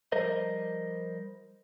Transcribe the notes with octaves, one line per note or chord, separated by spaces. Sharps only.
F3 G3 A#4 C5 D#5